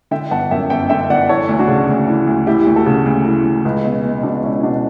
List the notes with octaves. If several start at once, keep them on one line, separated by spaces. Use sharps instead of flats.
D3 E5 G5
G1 F#5 A5
F#2 E5 G5
G1 E5 G5
D3 E5 G5
G1 D5 F#5
E3 A4 C#5
D2
D4 F#4
C#3
D2
E3
D2
E3 E4 G4
D2
F#4 A4
C#3
D2
E3
D2
C#2
B2
B2
C#2 D4 F#4
C#2 C#4 E4
B2 D4 F#4